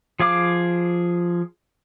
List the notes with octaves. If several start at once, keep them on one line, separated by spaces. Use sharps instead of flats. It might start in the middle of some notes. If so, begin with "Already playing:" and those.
F3 G#4 F5 D6